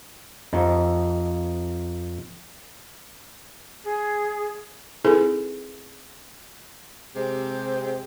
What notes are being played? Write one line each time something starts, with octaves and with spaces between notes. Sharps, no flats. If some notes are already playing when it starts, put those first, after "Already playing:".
F2 D#4
G#4
C4 D#4 E4 G#4 A4 B4
C3 G#3 C4 G4